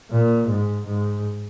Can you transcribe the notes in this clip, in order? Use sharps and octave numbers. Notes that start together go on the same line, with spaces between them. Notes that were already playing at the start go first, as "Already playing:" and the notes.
A#2
G#2
G#2